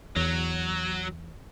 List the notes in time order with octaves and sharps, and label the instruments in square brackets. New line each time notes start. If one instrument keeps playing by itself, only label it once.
[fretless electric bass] E2 [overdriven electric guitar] F#3